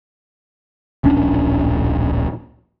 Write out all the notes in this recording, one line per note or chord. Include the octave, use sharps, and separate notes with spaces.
D1 A#1 C#4 D4